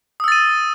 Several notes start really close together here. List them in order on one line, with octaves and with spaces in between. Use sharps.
D#6 E6 A6 D#7